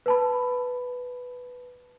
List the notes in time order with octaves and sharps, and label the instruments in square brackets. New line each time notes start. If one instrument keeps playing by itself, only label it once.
[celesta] B4 A5 B5